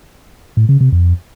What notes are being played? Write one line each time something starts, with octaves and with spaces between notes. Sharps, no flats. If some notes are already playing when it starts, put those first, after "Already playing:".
A2
C#3
C3
F2